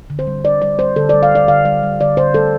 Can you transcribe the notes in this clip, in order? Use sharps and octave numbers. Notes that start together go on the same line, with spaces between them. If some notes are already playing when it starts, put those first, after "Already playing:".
D3
C5
G3
G3 D5
G3 D5
G3 C5
D3 A4
G3 D5
F5
G3 D5
D3 F5
G3 D5
G3
D3 D5
D3 C5
G3 A4